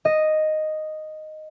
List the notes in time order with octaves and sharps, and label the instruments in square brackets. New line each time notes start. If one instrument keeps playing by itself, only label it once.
[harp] D#5